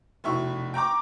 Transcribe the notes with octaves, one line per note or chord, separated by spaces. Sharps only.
F1 B2 E4 E5 C#6
G5 A#5 C#6 D6